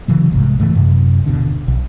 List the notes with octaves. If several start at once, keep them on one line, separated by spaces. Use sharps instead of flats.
C#3 E3 F#3
F1 C2 G#2
G#2 C#3 E3 A3
F#2 C3
D#1 G#1 B2 D3
B1